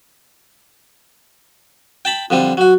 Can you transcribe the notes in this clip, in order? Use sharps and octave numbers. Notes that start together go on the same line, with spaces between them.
G5 A5 B5
F2 D3 G3 C4
F#3 F#4